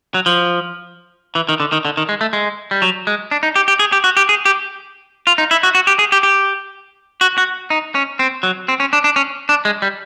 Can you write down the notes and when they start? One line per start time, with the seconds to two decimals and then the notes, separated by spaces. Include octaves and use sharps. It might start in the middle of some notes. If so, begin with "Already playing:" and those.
0.14 F#3
0.26 F3
1.35 E3
1.49 D#3
1.60 D3
1.72 D#3
1.85 D3
1.97 D#3
2.09 G#3
2.21 A3
2.33 G#3
2.71 G3
2.82 F#3
3.07 G#3
3.31 D4
3.43 D#4
3.56 G4
3.68 G4
3.79 G#4
3.92 G4
4.04 F#4
4.17 G4
4.29 G#4
4.45 G4
5.27 F4
5.38 D#4
5.51 E4
5.63 F#4
5.75 F#4
5.87 G4
5.99 G#4
6.12 G4
6.23 G4
7.21 F#4
7.38 F#4
7.70 D#4
7.95 C#4
8.19 C4
8.43 F#3
8.68 C4
8.80 C#4
8.93 D4
9.04 D4
9.16 C#4
9.49 D4
9.65 G#3
9.82 G3